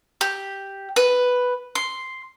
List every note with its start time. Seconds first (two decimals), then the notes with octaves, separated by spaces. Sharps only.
0.21 G4
0.96 B4
1.75 C6